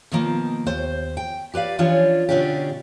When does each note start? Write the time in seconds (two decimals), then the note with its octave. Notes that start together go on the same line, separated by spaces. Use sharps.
0.12 B2 D#3 F3 A#3
0.66 D#2 C5
1.17 G5
1.54 G4 B4 D5 F5
1.79 E3 F3 C#4 D4 F4 C#5
2.29 B2 D3 C#4 D4 F4 G4